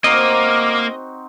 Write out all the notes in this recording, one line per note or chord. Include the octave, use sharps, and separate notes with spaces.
A#3 C4 D#4 F#4 D#5 D6 F6